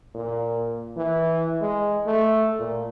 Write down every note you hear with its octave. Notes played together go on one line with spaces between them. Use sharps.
A#2
E3
G#3
A3
A#2